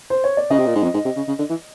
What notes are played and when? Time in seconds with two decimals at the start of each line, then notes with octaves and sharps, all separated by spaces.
0.10 C5
0.24 C#5
0.37 D5
0.50 C#3 D#5
0.59 C3
0.66 A#2
0.76 G#2
0.83 F2
0.94 G#2
1.05 C3
1.16 C#3
1.28 C#3
1.39 D3
1.50 E3